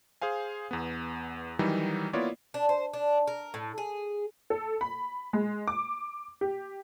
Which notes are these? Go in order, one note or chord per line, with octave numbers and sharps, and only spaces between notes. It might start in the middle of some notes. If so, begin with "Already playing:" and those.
G#4 C5 F5 G#5
E2 B3
D#3 E3 F#3 G3 D#4
A#3 B3 E4 F4 C#5 D5
D4
C5
D4
A#4
A2
G#4
A4
B5
G#3
D6
G4